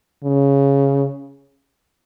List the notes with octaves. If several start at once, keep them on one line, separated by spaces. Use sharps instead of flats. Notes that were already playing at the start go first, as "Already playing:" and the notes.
C#3